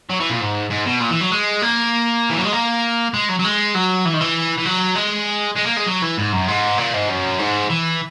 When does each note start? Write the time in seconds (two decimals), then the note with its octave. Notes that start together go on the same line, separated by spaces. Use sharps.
0.10 F#3
0.20 E3
0.30 A#2
0.41 G#2
0.70 G#2
0.86 B2
1.01 A#2
1.11 E3
1.21 F#3
1.32 G#3
1.62 A#3
2.30 E3
2.37 F#3
2.45 G#3
2.52 A#3
3.14 G#3
3.29 F#3
3.39 F#3
3.44 G#3
3.75 F#3
4.05 E3
4.14 D#3
4.20 E3
4.58 E3
4.66 F#3
4.96 G#3
5.56 G#3
5.66 A#3
5.77 G#3
5.87 F#3
6.02 E3
6.18 G#2
6.33 F#2
6.48 G#2
6.78 A#2
6.94 G#2
7.09 F#2
7.39 G#2
7.70 E3